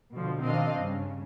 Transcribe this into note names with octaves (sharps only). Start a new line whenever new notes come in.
B2 D3 F3
B2 D#3 C4 D4 D#5 F5
G2 C#3